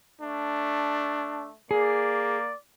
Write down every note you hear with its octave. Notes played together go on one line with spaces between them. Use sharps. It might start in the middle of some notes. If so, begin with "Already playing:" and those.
A3 D4
A#3 G#4 D5